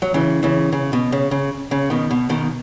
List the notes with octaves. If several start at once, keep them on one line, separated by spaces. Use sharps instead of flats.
F#3
C#3 E3
C#3 E3
C#3
B2
C#3
C#3
C#3
B2 D#3
B2
B2 D#3